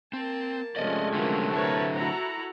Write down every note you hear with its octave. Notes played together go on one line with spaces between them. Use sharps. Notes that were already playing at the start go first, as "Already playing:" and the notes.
A#3 C4 A5
C3 F3 G#3 A3 C#4 D5 D#5
D3 F#3 A#3 B3
E4 A#4 B4 C#5 A5
E4 F#4 A4 F#5 A#5